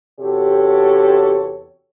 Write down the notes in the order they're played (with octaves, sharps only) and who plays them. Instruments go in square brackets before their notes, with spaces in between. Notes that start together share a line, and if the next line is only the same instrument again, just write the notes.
[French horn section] E2 C3 F#4 G4 A4 C#5